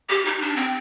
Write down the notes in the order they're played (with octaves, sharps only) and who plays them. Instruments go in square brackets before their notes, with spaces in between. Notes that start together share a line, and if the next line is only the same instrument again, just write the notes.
[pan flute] G4
D#4
D4
C4